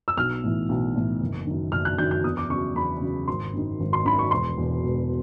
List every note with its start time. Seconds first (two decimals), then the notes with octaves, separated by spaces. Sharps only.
0.08 E6
0.17 B1 F6
0.43 A2 E3
0.69 B1
0.95 A2 E3
1.21 F#1
1.47 F#2 D#3
1.72 F#1 F6
1.85 F#6
1.98 F#2 D#3 G6
2.11 G6
2.24 E2 D#6
2.37 D6
2.50 C#3 C#6
2.53 F#3
2.75 E2 B5
3.01 C#3 F#3
3.27 G#1 C6
3.53 F#2 D#3
3.80 G#1
3.93 C6
4.05 F#2 D#3 B5
4.19 C#6
4.31 E1 C6
4.58 E2 B2
4.84 E1